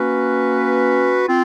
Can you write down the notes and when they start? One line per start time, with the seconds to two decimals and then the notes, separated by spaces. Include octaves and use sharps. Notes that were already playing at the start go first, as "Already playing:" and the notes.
Already playing: A#3 C#4 F#4 B4
1.27 C4 F4